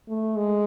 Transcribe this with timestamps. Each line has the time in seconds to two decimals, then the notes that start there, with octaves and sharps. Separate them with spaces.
0.08 A3
0.36 G#3